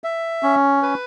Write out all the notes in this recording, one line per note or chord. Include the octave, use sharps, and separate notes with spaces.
E5
C#4
B4